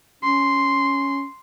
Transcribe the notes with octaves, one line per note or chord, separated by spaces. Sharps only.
C#4 C6